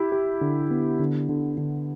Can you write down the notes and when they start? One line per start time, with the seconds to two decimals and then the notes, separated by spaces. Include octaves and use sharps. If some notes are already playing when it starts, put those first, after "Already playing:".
Already playing: E4 G4
0.12 G4
0.41 D3
0.71 B3
0.99 D3
1.29 D3
1.57 D3